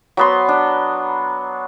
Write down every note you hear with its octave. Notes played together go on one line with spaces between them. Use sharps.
F#3 B3 C6
D4